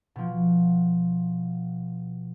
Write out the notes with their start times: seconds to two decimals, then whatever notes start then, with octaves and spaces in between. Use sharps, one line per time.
0.16 B2 F3